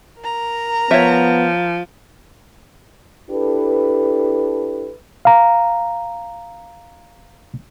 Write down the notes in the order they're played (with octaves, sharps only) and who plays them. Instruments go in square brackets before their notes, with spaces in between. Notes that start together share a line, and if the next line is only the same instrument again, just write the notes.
[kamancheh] A#4 A#5
[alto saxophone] F3 [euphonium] B3 [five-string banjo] C#5 E5
[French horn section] D4 E4 G4 A4 B4
[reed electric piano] F5 A#5